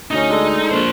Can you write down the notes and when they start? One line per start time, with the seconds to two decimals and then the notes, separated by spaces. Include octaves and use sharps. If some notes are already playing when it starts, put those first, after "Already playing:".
0.11 D2 C#4 D#4 D#5
0.30 G#3 D4 A4
0.71 A#1 A#4 C5